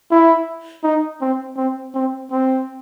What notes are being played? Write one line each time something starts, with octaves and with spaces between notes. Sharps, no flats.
E4
D#4
C4
C4
C4
C4